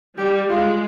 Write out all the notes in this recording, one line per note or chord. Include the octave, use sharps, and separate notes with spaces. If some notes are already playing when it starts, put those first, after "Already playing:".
G3 G4
G#3 F4